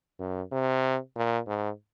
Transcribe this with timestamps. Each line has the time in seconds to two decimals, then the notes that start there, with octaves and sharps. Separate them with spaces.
0.19 F#2
0.52 C3
1.16 A#2
1.47 G#2